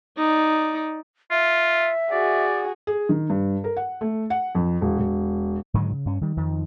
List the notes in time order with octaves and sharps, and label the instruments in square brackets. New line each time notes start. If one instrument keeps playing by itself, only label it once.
[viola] D#4 D5
[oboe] F4 [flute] E5
[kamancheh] F#4 G#4 [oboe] D5
[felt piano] G#4
D#3
G2
A#4
F#5
A3
F#5
F2
E1
E1
[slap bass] G#2 D3 D#3 F#3
C#3
G2 C#4
D#3 G3
F2 D#3 F3